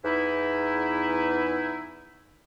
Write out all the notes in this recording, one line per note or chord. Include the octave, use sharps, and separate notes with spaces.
E2 D#4 E4